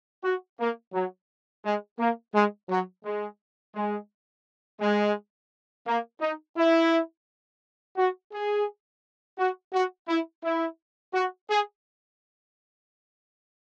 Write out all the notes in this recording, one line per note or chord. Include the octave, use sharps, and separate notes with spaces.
F#4
A#3
F#3
G#3
A#3
G#3
F#3
G#3
G#3
G#3
A#3
D#4
E4
F#4
G#4
F#4
F#4
E4
E4
F#4
G#4